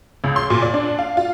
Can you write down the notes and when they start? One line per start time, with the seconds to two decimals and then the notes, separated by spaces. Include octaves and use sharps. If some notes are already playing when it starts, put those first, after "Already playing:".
0.24 C#2
0.36 C6
0.50 A#2
0.62 D5
0.74 D4
0.99 F5
1.17 F4